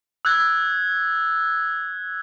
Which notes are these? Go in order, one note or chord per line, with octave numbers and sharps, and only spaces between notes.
E6 F#6 G#6